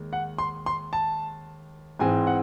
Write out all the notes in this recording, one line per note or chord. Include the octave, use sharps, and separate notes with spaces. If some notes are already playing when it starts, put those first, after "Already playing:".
Already playing: D#2 G#3
F#5
C6
C6
A5
G#2 E3 G#3 C4 G#5
F#5